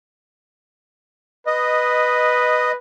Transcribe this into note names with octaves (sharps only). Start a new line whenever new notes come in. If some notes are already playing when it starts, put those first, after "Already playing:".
B4 D#5